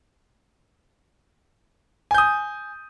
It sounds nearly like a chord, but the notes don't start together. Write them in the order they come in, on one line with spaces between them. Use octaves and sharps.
G#5 G6 D#6